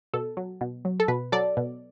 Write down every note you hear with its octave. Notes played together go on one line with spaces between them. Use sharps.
B2 A4
F#3
B2
F#3
A4
B2 B4
F#3 A4 D5
B2